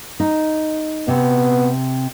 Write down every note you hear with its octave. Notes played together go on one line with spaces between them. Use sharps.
D#4
C3 B3